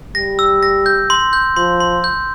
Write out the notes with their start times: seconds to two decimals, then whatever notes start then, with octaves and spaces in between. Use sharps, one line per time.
0.15 G3 A#6
0.39 E6
0.63 A#6
0.86 G6
1.10 C6
1.33 G6
1.56 F3 C6
1.80 C6
2.04 G6